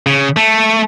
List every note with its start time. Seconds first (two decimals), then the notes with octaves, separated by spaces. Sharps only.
0.06 C#3
0.36 A3